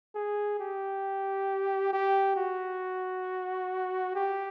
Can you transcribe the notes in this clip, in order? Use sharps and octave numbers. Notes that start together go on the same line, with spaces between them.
G#4
G4
G4
F#4
G4